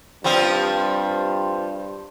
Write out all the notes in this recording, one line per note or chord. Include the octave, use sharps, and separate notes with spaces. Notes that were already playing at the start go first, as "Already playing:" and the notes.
G2 F3 G3 C4